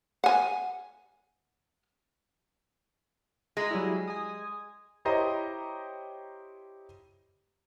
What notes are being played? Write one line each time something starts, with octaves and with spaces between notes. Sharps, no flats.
F#5 G#5
G#3 G#4 A#5 D#6
F#3 G3 E4
G#5 D#6
E4 G4 C5 C#5 D#5 A#5